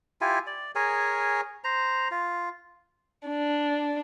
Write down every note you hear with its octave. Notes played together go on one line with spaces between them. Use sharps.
E4 F4 G4 G#5
D5
G#4 A#4 C#5 G#5
C5 A#5
F4
D4